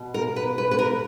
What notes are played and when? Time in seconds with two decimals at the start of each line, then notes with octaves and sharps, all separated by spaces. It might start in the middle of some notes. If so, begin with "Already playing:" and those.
Already playing: B2
0.14 A#4
0.36 B4
0.58 B4
0.71 B4
0.79 A#4